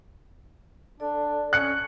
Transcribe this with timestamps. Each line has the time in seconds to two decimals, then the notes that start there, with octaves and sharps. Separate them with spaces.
1.00 D4 A4 D5
1.53 C#4 F#6 C#7